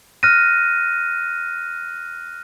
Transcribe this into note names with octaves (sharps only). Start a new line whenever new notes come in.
F6 F#6 A#6 D#7